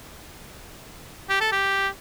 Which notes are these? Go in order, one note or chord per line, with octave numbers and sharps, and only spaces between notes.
G4
A4
G4